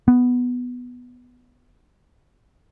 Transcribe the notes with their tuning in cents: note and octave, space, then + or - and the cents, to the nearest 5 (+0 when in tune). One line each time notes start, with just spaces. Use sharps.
B3 +0